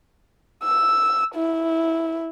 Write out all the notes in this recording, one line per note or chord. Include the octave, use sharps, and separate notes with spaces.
E6
E4